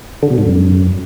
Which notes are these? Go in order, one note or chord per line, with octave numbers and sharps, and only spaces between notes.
D3
B2
G#2
F#2